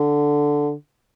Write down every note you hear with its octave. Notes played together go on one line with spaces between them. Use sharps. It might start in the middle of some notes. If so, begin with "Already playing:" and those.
Already playing: D3